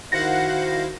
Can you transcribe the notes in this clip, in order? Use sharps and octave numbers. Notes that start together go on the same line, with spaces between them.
D#3 E4 F#4 C5 F5 F#5 A#6